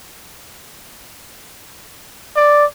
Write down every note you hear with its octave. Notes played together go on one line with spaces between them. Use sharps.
D5